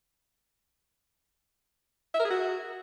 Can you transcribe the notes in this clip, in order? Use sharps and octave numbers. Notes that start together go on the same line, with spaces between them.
E5
A#4
G#4
F#4